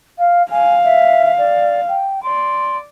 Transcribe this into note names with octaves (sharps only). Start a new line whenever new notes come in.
F5
F5 G#5
E5
D5
G5
D5 C6